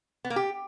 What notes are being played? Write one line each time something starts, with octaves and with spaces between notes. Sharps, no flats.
B3
A#3
G4